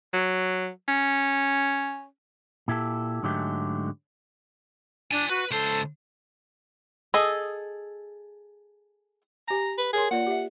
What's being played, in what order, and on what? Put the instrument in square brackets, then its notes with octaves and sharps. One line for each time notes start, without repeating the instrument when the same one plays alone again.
[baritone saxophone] F#3
C#4
[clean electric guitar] A#2 E4 G4 A4
G#2 D3 F#3 G#3 A3 G4
[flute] D4 [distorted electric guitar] D5 G#5
[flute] F#4 [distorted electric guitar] B4
[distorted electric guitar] C#2 C5 [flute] A4
[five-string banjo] G#4 A4 D#5
[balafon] G4 G#5 [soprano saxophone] A#5
[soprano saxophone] B4
[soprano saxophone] G#4 [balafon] A#4 C#5 C6
[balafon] A#3 F4 D5 [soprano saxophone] F#5
[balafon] G4 E5